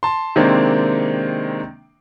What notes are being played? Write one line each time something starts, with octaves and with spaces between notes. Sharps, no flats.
A5 C6
C3 D#3 G#3 A#3 C4 D4